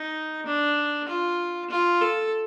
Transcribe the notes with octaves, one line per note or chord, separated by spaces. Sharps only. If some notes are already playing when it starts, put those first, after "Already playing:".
Already playing: D#4
D4
F4
F4
A4